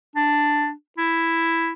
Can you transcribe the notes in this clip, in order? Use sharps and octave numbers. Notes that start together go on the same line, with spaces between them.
D4
E4